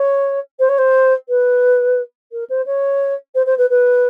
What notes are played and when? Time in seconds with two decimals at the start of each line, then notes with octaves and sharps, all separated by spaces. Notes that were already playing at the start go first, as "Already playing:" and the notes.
Already playing: C#5
0.59 C5
0.68 C#5
0.78 C5
1.28 B4
2.32 A#4
2.49 C5
2.66 C#5
3.34 C5
3.46 C5
3.57 B4
3.69 B4